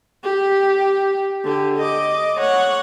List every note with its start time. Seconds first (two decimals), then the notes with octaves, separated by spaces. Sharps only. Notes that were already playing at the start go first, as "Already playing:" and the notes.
0.23 G4
1.44 D3 G4
1.78 D#5 D6
2.39 C#5 F#5